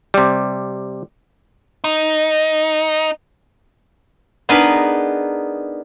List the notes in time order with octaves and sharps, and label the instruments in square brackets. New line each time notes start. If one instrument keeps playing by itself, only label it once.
[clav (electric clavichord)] C3 G3
[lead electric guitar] D#4
[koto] B3 D4 D#4 G#4 A#4 B4